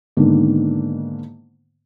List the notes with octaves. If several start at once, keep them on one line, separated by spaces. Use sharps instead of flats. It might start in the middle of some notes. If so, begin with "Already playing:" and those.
G#2 D3 D#3 A#3 B3